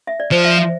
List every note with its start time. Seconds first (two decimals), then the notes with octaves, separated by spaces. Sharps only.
0.07 E5
0.20 D5
0.31 F3 C5
0.44 E5
0.57 E5